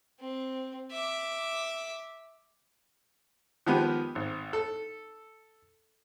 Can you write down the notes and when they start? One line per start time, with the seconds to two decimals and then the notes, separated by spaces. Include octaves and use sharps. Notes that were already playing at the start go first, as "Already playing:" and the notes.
0.20 C4
0.92 E5 D6
3.66 D#3 F3 G#3 B3 G4
4.15 G#1
4.53 A4